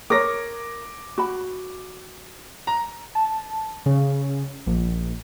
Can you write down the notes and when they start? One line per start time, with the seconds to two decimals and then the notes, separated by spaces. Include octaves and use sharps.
0.10 A#4 C#5 D6 A#6
1.18 F#4 B5
2.67 A#5
3.15 A5
3.86 C#3
4.66 A#1